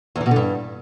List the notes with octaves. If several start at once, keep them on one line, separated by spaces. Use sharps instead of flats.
E2
E3
B2
D3
G2